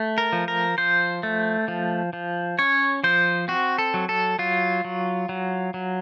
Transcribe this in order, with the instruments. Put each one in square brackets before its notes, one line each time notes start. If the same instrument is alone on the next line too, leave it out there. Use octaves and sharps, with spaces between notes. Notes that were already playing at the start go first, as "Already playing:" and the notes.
Already playing: [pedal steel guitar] A3
A#4
F3
A#4
F3 C5
A3
F3
F3
C#4 C#5
F3 C5
C4 F#4
A4
F#3
A4
F#3 F4
F#3
F#3
F#3